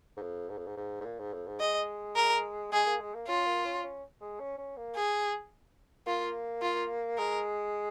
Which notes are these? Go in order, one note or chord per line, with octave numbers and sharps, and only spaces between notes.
G#2
F2
G#2
F2
G#2
G#2
G#2
A#2
G#2
F2
G#2
G#3 D#5
A#4
G#3 G#4
A#3
G#3
A#3
C#4 F4
A#3
C#4
C#4
G#3
C#4
C#4
A#3
G#4
A#3 F4
F4
G#3 A#4